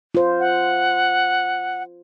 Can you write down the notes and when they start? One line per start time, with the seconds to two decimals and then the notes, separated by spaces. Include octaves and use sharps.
0.15 F4 C5
0.40 F#5